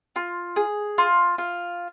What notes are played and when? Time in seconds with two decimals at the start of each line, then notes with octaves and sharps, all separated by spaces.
0.16 F4
0.56 G#4
0.98 F4
1.38 F4